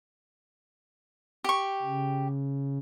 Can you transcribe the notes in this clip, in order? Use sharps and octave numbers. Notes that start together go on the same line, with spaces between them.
G4 C#6
C#3